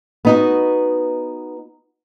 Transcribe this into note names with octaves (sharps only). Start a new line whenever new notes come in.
B3 D#4 F#4